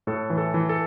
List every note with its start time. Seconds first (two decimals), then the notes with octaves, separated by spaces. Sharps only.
0.07 A2 A4
0.30 E3
0.38 A4
0.54 E3
0.69 A4